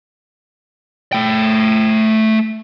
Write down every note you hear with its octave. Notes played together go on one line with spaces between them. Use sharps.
A3 G5